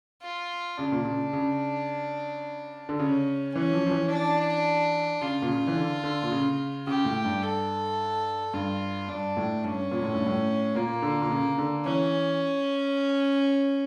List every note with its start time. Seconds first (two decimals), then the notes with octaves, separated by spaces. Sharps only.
0.22 F4
0.78 C#3 D4
0.92 A#2
1.05 C#3
1.33 C#3
2.89 D3
2.99 C#3 C#4
3.54 E3 C#4
3.73 F3
3.87 F3
3.91 E3
4.10 D4
5.21 C#3 F4
5.42 A#2
5.48 C#3
5.67 E3
5.76 D3
6.04 D3
6.23 A#2
6.31 C#3
6.87 C#3 G4
7.05 A2
7.25 G2
7.42 A4
8.54 G2 F4
9.08 G2 D4
9.37 A2
9.64 G2 C#4
9.91 A#2
10.03 A2
10.14 G2
10.26 A2
10.75 A#2 A#3
11.02 D3
11.22 A#2
11.31 C#3
11.58 D3
11.85 E3 C#4